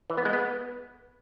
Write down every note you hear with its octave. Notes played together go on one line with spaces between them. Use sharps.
E3
B3
G#3
B3